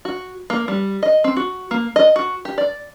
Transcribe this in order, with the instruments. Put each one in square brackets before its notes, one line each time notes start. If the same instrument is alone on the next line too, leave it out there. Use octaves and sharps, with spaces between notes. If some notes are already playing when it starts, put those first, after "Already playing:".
[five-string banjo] F#4
A#3
G3
D#5
C4
F#4
A#3
D#5
F#4
G4
D5